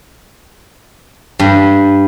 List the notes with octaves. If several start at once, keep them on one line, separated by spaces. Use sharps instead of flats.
G2